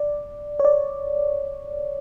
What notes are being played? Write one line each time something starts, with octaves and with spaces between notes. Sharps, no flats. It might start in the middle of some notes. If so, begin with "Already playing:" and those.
Already playing: D5
C#5
D5